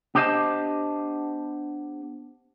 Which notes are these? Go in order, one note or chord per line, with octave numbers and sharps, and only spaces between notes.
B3 D4 G4 C5 D#5 A5